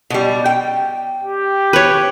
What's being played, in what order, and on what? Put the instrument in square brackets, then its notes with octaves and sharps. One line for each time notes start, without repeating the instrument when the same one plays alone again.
[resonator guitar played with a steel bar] B2 G3
G5
[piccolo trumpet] G4
[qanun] B4 C#5